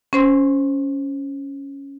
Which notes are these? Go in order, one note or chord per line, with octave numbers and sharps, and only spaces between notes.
C#4 C5 C6